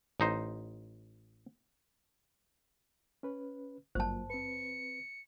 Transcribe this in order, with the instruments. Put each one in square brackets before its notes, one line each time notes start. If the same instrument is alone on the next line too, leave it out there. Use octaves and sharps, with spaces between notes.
[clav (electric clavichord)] A1 D#4 C5
[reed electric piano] C#4 B4
[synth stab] G#1 G2 [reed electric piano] F#3 A#3 F4 [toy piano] C5 A5
[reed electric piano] C4 B4 [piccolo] C#7